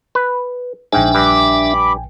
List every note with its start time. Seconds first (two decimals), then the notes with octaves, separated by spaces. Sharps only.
0.15 B4
0.93 A#1 G#2 D4 E5 G5 G#5
1.15 G2 B5 D6